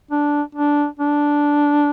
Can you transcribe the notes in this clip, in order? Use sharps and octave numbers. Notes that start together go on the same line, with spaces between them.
D4
D4
D4